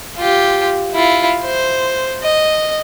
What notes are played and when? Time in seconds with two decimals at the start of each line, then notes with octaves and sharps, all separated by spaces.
0.18 F4 G4
0.94 E4 F4
1.45 C5
2.23 D#5